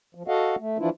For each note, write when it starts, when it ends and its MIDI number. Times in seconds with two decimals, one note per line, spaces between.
0.15 0.23 53
0.28 0.56 66
0.28 0.56 69
0.28 0.56 75
0.28 0.56 77
0.28 0.56 78
0.59 0.78 57
0.79 0.90 52
0.79 0.90 53
0.79 0.90 62
0.79 0.90 64
0.79 0.90 65